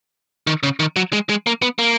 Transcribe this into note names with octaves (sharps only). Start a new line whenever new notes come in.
D#3
C#3
D#3
F#3
G#3
G#3
A#3
B3
A#3